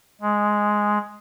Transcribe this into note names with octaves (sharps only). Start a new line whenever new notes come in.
G#3